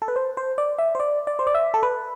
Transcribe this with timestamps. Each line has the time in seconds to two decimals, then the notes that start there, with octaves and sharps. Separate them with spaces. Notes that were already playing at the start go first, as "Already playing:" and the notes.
0.02 A4
0.08 B4
0.16 C5
0.37 C5
0.58 D5
0.78 E5
0.95 C5
1.00 D5
1.27 D5
1.39 C5
1.47 D5
1.55 E5
1.74 A4
1.83 B4